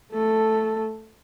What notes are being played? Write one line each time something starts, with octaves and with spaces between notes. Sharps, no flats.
A3 A4